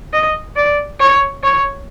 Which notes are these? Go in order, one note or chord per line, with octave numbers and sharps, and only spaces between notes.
D#5
D5
C#5
C#5